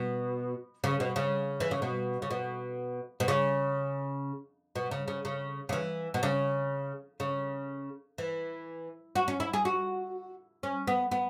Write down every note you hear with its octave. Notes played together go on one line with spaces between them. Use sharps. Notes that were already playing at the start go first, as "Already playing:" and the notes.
Already playing: B2
C#3
B2
C#3
E3
C#3
B2
C#3
B2
B2
C#3
B2
C#3
C#3
C#3
C#3
E3
B2
C#3
C#3
E3
F#4
C#4
E4
G#4
F#4
C#4
B3
B3